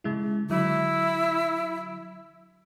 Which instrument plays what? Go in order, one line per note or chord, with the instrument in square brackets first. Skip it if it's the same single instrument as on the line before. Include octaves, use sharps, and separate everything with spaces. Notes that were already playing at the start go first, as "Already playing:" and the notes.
[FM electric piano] C#3 G#3 E4
[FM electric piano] D3 F#3 [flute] E4